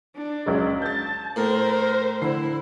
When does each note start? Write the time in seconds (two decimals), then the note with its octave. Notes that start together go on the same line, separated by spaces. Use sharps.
0.17 D4
0.46 C#2 F#3 G#3
0.82 A5 G6 A6
1.36 A2 A#4 C5
2.22 D3 E4 C7